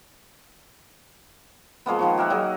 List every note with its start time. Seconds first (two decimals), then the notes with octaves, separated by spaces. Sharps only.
1.86 F3 G#3 A#3 B3
1.99 D#3 F3 C#6
2.17 G4 A#4 E5 F#5
2.30 F#3 D#4 G#4